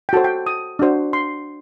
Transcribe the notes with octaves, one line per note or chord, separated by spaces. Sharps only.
G5
F#4 A4 C5 A5
G5
D#6
D4 F#4 C5
C6